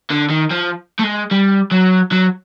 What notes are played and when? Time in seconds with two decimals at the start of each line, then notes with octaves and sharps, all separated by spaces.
0.11 D3
0.30 D#3
0.51 F3
0.99 A3
1.04 G#3
1.31 G3
1.71 F#3
2.11 F#3